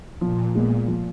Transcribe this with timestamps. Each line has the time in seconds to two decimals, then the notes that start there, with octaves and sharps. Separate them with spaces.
0.21 A#2 F3
0.54 A#2 G#3 B3
0.87 F3